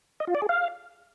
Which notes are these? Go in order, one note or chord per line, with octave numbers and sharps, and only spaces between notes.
D#5
F4
D5
G#4
F5